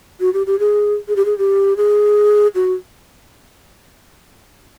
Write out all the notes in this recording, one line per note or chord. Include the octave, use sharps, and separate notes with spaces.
F#4
G4
G4
G#4
G#4
G4
G#4
G4
G#4
F#4